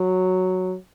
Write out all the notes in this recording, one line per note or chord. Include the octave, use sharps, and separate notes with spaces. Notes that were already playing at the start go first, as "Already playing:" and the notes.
Already playing: F#3